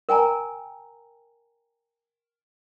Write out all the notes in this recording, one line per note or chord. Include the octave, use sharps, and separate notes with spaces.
A#4 G5 G#5 A#5